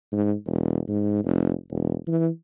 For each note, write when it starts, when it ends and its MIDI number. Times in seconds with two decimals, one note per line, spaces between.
0.12 0.33 44
0.46 0.79 28
0.88 1.24 44
1.24 1.52 29
1.70 1.94 28
2.07 2.28 52